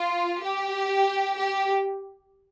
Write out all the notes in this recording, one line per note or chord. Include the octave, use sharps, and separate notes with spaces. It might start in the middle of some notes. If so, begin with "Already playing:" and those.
Already playing: F4
G4
G4